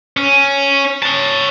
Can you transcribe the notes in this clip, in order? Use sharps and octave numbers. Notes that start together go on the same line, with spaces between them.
C#4
C#5 A5